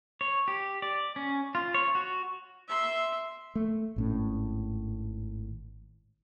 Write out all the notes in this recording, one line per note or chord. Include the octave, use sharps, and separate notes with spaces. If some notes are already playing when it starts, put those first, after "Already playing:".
C#5
G4
D5
C#4
F4
C#5
F#4
E5 C6
A3
G#1 A2 C#4